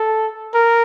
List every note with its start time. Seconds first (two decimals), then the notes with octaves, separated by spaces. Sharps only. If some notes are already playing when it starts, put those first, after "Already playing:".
Already playing: A4
0.54 A#4